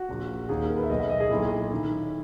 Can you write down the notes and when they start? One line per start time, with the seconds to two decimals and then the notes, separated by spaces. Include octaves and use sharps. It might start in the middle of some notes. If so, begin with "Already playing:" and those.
Already playing: F#4
0.09 A#1 A#2
0.49 D#2 D#3 G#4
0.63 A#4
0.76 B4
0.83 E5
0.90 B1 B2 D#5
0.99 E5
1.10 D#5
1.20 G#4
1.30 B1 A#2 E4
1.74 D#3